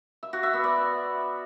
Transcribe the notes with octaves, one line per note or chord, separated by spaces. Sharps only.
E5
F#4
E5
B3
D5